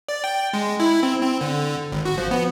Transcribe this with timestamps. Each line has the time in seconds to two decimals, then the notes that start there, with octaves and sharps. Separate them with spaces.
0.09 D5
0.24 G5
0.53 G#3
0.80 E4
1.03 C4
1.21 C4
1.41 D3
1.92 G#1
2.05 F#4
2.18 F3
2.31 B3